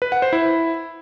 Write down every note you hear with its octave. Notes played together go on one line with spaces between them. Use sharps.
B4
F#5
C5
E4